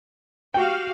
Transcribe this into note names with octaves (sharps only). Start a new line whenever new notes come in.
F#4 G4 F5 G5